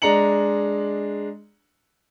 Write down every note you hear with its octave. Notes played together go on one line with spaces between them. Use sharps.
G#3 D4 A#5 C#7 F#7